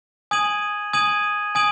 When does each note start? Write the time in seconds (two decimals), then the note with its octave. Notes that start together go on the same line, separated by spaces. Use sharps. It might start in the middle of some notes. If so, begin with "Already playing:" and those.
0.31 G#5 D#6 G#6 D#7 F#7
0.93 G#5 D#6 G#6 D#7 F#7
1.55 G#5 D#6 G#6 D#7 F#7